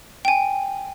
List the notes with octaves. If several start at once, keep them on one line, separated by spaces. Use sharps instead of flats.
G5 G#5